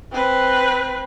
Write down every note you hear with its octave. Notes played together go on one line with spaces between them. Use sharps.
C4 B4